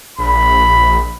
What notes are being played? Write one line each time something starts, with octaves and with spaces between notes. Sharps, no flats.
A#1 B5